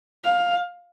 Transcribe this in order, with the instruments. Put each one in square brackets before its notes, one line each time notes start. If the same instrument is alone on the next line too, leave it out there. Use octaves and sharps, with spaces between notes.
[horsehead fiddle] F5